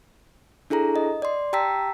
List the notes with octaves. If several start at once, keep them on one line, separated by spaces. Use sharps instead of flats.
D4 E4 G#4 A4 A#5
D#5
D5 C6
G4 G5 A5 A#5 E6 B6